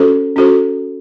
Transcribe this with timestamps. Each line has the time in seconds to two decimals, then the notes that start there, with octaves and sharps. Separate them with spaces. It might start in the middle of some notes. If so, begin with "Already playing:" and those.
Already playing: C#4 F#4 A4 C5
0.36 C#4 F#4 A4 C5